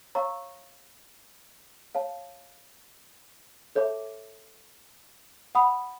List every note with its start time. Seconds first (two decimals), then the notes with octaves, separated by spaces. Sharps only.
0.15 C#5 F5 A#5 C#6 E6
1.95 C#5 F5 A5
3.75 A4 C#5 E5 A5 D6
5.55 F#5 B5 D#6